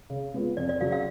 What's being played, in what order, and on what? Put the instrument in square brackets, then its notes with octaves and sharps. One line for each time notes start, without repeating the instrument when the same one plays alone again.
[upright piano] C#3
G#3 B3 F4
[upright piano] F2 [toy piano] D5
[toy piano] D5
[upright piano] C#3 F#3 C#4 G#4 [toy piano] F5
[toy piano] F5